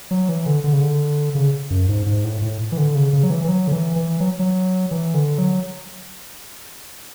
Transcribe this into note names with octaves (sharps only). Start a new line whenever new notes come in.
F#3
E3
D3
D3
C#3
D3
C#3
F#2
G#2
G#2
A2
A2
E3
D3
C#3
C#3
F#3
E3
E3
F#3
D3
E3
E3
F#3
F#3
E3
D3
F#3